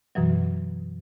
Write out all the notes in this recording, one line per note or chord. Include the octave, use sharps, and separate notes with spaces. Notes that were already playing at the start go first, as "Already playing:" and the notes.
F#2 B2 E3 F#3